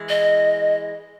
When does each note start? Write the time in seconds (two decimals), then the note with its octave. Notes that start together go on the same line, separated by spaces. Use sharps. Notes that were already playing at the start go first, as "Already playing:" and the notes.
Already playing: E3 G#3
0.09 D#5